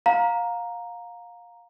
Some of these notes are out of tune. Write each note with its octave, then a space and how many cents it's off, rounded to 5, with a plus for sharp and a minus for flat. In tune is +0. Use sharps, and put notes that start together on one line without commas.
F5 +20 A#5 +0